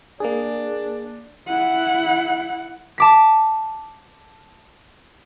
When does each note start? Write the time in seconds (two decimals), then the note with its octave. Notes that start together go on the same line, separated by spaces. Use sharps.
0.20 A#3 D4 G#4
1.48 E4 F#5
2.98 A5 D6 B6